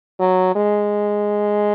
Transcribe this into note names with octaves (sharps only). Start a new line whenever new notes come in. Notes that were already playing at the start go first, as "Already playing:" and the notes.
F#3
G#3